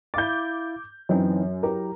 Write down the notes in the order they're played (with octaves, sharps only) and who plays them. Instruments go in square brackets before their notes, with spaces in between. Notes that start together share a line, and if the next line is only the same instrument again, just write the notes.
[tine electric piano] E4 F5 A6 [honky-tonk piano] D6 G6
[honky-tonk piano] F#2 [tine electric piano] E3 C4 D#4
[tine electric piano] F#3 E4 G4 [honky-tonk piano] A#4